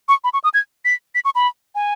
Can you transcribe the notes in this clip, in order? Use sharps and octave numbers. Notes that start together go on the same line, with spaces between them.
C#6
B5
C#6
D#6
G#6
B6
B6
C#6
B5
G#5